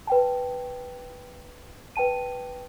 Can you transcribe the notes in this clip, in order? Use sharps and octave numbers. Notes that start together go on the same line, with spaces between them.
B4 G5 A5
B4 G5 A5 D#7